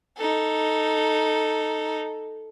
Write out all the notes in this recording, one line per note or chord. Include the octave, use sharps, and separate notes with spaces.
D#4 A4